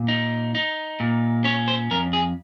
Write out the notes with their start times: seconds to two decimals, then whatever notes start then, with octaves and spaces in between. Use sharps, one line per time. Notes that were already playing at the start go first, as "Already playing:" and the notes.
Already playing: A#2
0.08 D#4
0.55 D#4
1.00 A#2
1.44 C#4 C#5
1.68 C5
1.91 F2 A#4
2.13 G#4